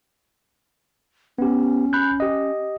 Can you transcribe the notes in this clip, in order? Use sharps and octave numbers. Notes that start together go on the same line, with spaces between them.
B3 C#4 G4
B5 F#6 G6
G4 D#5